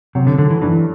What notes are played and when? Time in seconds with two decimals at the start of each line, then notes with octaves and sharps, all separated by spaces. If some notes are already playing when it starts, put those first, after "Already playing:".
0.15 C3 F#3
0.27 D3
0.38 D3 A3
0.51 E3
0.62 G2 E3